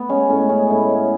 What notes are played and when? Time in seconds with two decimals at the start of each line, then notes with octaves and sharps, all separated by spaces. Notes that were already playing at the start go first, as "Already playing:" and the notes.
Already playing: B3
0.09 G#3 C#4
0.29 A2 C#4
0.49 G#3 C#4
0.69 A2 E4
0.89 G#3